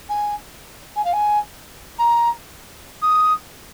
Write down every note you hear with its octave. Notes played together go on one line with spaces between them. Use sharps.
G#5
G#5
F5
G#5
A#5
D#6